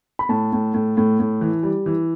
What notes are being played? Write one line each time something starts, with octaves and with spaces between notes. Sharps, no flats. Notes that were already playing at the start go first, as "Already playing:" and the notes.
B5
A2 A5
A2
A2
A2
A2
E3
G3
E3